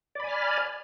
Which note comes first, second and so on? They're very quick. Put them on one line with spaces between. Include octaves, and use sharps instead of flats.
D5 B5 G#5 F6